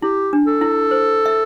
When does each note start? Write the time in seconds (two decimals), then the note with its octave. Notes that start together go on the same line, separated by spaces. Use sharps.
0.02 E4 G4
0.33 D4
0.47 A4
0.61 E4
0.91 C5
1.26 E5